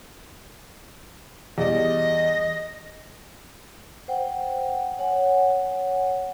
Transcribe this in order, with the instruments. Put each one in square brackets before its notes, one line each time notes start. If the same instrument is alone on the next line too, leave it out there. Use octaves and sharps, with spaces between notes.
[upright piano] E2 G3 D5 [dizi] D#5
[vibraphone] C5 F#5 G5
C#5 F#5 G#5